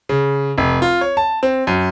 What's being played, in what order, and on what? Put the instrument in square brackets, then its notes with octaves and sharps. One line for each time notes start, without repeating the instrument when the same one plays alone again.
[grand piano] C#3
F1
F4
C#5
A5
C4
F#2